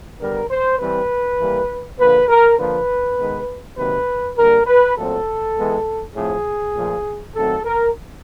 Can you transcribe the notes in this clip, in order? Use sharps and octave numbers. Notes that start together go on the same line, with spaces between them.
D3 G3 B3 A#4
C5
E3 G3 C4 B4
E3 G3 A#3
D3 F3 A#3 B4
A#4
D3 F3 A#3 B4
D#3 G#3 B3
C3 D#3 F#3 A#3 B4
D3 G3 A#3 A#4
B4
A#2 F#3 A3 C4 A4
E3 G#3 B3
A2 F3 A3 C4 G#4
A#2 F3 A3
D#3 F#3 A3 C4 A4
A#4